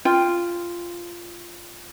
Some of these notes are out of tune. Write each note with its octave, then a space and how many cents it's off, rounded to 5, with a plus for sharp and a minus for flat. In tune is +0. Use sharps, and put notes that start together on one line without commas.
F4 -10 G5 +15